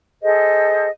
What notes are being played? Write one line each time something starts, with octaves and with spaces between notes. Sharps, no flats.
G#4 A4 C5 D#5